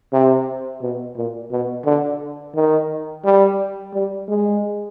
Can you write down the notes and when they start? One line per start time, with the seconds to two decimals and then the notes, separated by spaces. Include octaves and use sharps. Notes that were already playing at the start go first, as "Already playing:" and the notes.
0.13 C3
0.82 B2
1.17 A#2
1.51 B2
1.86 D3
2.55 D#3
3.25 G3
3.94 G3
4.28 G#3